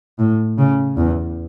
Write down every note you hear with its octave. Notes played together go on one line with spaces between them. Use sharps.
A2
C#3
E2